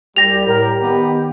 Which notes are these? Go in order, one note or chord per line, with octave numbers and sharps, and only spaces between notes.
C2 G3 G4 A#6 F7
A2 A#4
D#3 B3